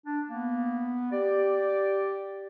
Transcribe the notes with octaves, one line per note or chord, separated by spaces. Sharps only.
D4
A#3 B3
G4 D5